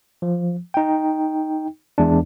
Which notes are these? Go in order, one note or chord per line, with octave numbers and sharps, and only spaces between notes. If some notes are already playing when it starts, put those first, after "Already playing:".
F3
D#4 G5
E2 G#3 D4